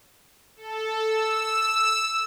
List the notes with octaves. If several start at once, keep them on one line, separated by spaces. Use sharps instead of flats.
A4
E6